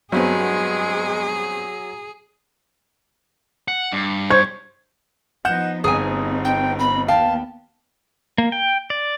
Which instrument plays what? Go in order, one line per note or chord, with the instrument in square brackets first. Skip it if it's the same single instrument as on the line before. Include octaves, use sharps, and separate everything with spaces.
[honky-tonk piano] G2 B3 C4 [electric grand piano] F#3 [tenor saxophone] G#3 [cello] G#4
[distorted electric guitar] F#5
G2
[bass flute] C5 [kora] C#5 [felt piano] G#6
[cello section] F3 B3 D#4 [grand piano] F#5 G6 E7
[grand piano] G1 [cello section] B3 C4 D#4 [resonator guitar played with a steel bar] G#4 G#5
[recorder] G5
B5
[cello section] D#2 B3 [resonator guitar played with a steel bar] F5 [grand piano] G5 [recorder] A5
[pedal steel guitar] A#3
G5
D5